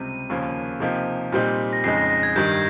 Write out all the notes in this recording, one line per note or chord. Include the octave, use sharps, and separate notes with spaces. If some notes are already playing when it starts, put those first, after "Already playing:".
Already playing: C#2 C3 G3 C4 D#7
D#2 C#3 F3 A#3
C3 F3 A#3 D#4 G4
A#2 G3 C4 D#4
A#6
F2 C#3 G#3 D#4 C7
A#6
A#6
G#6
G2 D#3 G3 G6